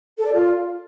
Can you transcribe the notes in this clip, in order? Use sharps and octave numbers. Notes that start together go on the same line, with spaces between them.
A4
D5
F4